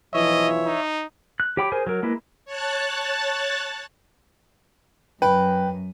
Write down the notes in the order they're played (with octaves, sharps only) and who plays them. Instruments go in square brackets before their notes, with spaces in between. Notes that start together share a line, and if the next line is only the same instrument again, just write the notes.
[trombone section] B1 E3 F3 [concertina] C#5 E5 [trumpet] D#5
[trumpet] D#4
[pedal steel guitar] F#6
G4 C#5 G5 B5 D6
G#4 A#4 C5 G#5
F#3 A#4
G#3 A#3 E4 B4
[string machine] C#5 A5 F#6 A6
[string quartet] F#2 [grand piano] B4 [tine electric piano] G5